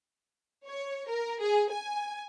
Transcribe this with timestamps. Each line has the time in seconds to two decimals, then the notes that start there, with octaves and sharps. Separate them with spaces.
0.67 C#5
1.08 A#4
1.41 G#4
1.71 G#5